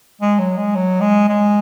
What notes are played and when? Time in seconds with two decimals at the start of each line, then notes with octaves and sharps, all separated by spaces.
0.21 G#3
0.39 F#3
0.57 G#3
0.76 F#3
1.01 G#3
1.29 G#3